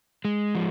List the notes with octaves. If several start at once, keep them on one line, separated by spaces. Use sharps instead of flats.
G#3
F3